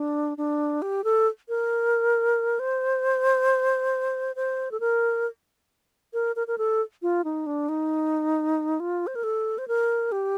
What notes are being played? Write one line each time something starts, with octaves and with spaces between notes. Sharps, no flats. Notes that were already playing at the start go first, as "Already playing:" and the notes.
Already playing: D4
D4
G4
A4
A#4
C5
C5
A4
A#4
A#4
A#4
A#4
A4
F4
D#4
D4
D#4
F4
C5
A#4
A4
C5
A#4
G4